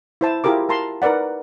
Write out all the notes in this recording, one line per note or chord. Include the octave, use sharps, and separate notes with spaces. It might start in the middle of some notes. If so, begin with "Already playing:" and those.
E4 C5 A5
E4 F4 G4 G#4 A#4 D6
A#4 A5 A#5 C6
D#4 A#4 B4 D5 F#5